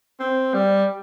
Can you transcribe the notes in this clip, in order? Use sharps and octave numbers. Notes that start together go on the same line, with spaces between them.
C4
G3